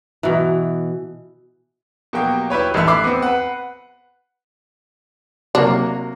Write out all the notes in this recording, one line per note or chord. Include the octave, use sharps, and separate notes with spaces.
B2 E3
B2 F#3 A#3 G4 G5
E4 G4 B4 C#5
A1 G2 D#3 A3 E5 F#6
E5 B5 D6 F#6 C7
B3 C4
B4 F#5
C3 F#3 A#3 D4